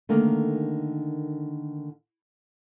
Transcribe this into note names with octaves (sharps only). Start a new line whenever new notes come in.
D3 D#3 A3 A#3